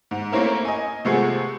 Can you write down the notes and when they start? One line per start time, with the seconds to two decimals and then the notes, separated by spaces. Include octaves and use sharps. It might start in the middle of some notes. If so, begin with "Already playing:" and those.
0.11 G#2
0.32 A3 A#3 C4 C#4 E4 A#4
0.65 D#5 G#5
1.05 C3 F3 G#3 A3 B3 G#4